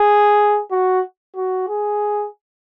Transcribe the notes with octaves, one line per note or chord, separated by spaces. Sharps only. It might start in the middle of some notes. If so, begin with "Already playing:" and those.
Already playing: G#4
F#4
F#4
G#4